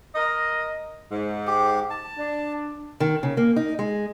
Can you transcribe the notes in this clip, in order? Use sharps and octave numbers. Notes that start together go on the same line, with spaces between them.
A#4 D#5
G#2
G4
A5
D4
D#3
C#3
A#3
D#4
G#3